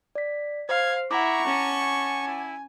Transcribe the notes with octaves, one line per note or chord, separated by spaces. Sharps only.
D5 B6
C5 F5 G#6 C7
E4 F#5 A#5 C#6 D6
C#4 A5
G#5
E4